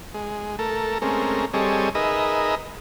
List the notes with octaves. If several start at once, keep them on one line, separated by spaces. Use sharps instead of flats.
G#3
A3 A4 A#4
G#3 A3 C4 C#4 A#4
G3 C4 G#4 A4 C#5 D#5
D#4 G#4 A#4 B4 D#5 E5